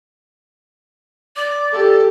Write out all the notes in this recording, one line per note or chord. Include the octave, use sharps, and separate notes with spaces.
D5 D6
G4 A4